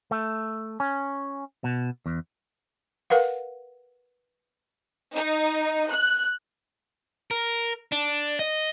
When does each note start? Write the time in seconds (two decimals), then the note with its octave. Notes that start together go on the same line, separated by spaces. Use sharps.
0.11 A3
0.80 C#4
1.64 B2
2.06 E2
3.10 A#4 B4 F5 F#5
5.15 D#4
5.91 F#6
7.31 A#4
7.92 D4
8.39 D#5